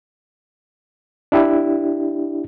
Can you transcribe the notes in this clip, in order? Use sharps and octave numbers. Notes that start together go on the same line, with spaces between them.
D4 E4 G4